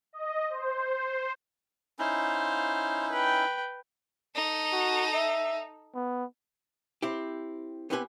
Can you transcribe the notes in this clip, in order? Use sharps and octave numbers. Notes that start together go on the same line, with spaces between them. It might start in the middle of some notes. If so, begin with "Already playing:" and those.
D#5
C5
C#4 D#4 E4 C5 F5
B4 G5
D#4 A4
F#4
E5
B3
C4 E4 G4
B3 C4 E4 G4 B4 G#5